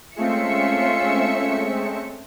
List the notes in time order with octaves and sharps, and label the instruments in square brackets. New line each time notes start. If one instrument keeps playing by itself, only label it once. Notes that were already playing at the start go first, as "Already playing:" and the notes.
[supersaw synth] G#3 A3 C4 [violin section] C#4 E5 C#7 [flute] F4